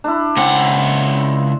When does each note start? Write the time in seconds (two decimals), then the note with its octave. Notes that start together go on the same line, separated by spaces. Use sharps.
0.04 D4 E4
0.37 C#2 C4 F#5